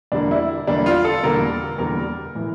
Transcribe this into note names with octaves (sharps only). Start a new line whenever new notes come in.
E2 D3 G3 A#3 D4
E4
E2 D3 G3 A#3 D4
F4
A4
E2 D3 G3 A#3 A#4
E2 D3 G3 A#3 A#4
A2 E3